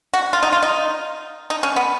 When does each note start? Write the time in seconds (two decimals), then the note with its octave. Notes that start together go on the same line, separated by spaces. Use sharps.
0.14 F#4
0.33 F4
0.43 D#4
0.52 F4
0.62 D#4
1.50 D#4
1.63 C#4
1.76 B3